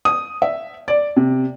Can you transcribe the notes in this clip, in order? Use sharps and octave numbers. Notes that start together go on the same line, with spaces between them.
D#6
E5
D5
C3